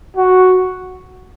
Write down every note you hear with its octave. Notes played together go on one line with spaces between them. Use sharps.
F#4